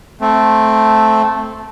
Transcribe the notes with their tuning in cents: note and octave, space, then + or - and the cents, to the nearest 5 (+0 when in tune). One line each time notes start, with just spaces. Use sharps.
A3 -5 C4 +0